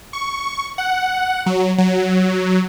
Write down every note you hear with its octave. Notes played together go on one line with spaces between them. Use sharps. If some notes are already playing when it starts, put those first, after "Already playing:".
C#6
F#5
F#3
F#3